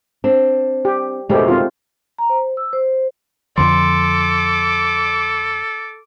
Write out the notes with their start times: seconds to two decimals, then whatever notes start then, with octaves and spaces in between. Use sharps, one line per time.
0.24 C4 D4
0.85 G4
1.30 F2 B2 D#3 G#3 A3 G4
1.48 C4 F4
2.19 A#5
2.30 C5
2.57 E6
2.73 C5
3.58 F2 D3 F3 A4 C6 D6